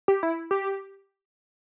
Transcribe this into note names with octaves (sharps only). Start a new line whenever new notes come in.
G4
E4
G4